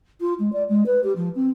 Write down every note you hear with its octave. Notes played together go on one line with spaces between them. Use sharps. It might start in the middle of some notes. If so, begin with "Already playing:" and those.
F4
G#3
D5
G#3
B4
G4
F3
C4